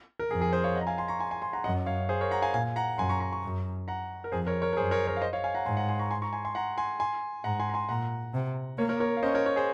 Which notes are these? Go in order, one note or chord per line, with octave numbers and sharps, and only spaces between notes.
A#4
F2 G#4
G#4
G#4 C5
C#5 F5
D#5 F#5
A#5
F5 G#5
G#5 C6
A#5 C#6
G#5 C6
G#5 C6
G#5 C6
F#5 A#5
F#2 D#5 F#5
C#5 F5
G#4 C5
A#4 C#5
F#5 A#5
F5 G#5
A#2 F5 G#5
F#5 A#5
F#2 G#5 C6
A#5 C#6
A#5 C#6
A#5 C#6
F#2
F#5 A#5
A#4
F2 G#4 C5
A#4 C#5
A#4 C#5
A#4
F#2 G#4 C5
A#4 C#5
A#4 C#5
F5
C5 D#5
C#5 F5
F5 G#5
F#5 A#5
G#2 G#5 C6
F#5 A#5
G#5 C6
A#5 C#6
G#5 C6
A#5 C#6
G#5 C6
G#5 C6
F#5 A#5
G#5 C6
G#5 C6
G#2 F#5 A#5
G#5 C6
A#5
G#5 C6
A#2 F#5 A#5
C3
A#3 A#4 C#5
A#4 C#5
A#4 C#5
F5
C#4 C5 D#5
A#4 C#5
A#4 C#5
G#4 C5